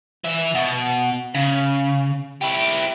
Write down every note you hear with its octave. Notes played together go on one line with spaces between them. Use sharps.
E3 E5
B2
C#3
E4 G4